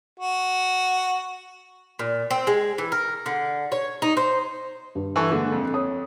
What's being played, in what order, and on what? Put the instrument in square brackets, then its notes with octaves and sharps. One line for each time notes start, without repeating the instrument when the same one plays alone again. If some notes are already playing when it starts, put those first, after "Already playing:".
[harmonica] F#4
[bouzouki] A#2
C4
G#3
E3
A#4
D3
C#5
D#4
C5
[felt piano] G2
[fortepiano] E3 A4 C#6
[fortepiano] D3 [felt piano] G#3 A#3 A4
[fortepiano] F2
[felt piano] C#5 D#6